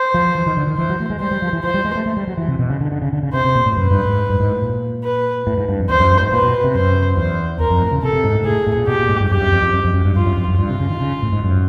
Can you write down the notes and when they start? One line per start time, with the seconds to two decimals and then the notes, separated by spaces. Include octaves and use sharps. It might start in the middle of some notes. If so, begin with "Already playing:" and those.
Already playing: C5
0.14 F3
0.35 E3
0.46 D#3
0.57 D3
0.67 D#3
0.78 E3 C5
0.89 F#3
1.00 A3
1.10 G#3
1.20 G3 C5
1.31 G3
1.42 F3
1.53 E3
1.64 F3 C5
1.74 G3
1.85 G#3
1.95 A3
2.06 A3
2.17 G3
2.27 F#3
2.37 E3
2.48 C3
2.59 B2
2.70 C#3
2.81 D3
2.92 D3
3.02 C#3
3.13 D3
3.23 C#3
3.33 C3 C5
3.45 C3
3.55 A#2
3.66 A2
3.76 F#2 B4
3.91 G2
4.05 G#2
4.30 G2
4.40 G#2
4.51 A2
4.62 A#2
5.04 B4
5.47 A2
5.58 G#2
5.69 G2
5.79 F2
5.90 E2 C5
6.00 F#2
6.11 G2
6.21 G#2
6.32 A#2 B4
6.43 B2
6.64 C3
6.75 F#2 C5
7.17 E2 C5
7.60 E2 A#4
7.70 F2
7.82 A2
7.91 C#3
8.03 C3 A4
8.13 C3
8.24 G#2
8.34 A2
8.45 A2 G#4
8.67 A2
8.77 A#2
8.88 B2 G4
8.99 A#2
9.09 G#2
9.20 G2
9.30 F#2 G4
9.41 F#2
9.52 F2
9.62 F2
9.73 F#2
9.84 F2
9.94 F#2
10.05 G2
10.16 G2 F4
10.26 F#2
10.37 F2
10.48 F#2
10.58 G2 F4
10.69 C3
10.80 C#3
10.90 D#3
11.01 C#3
11.23 A2
11.32 G#2
11.44 F#2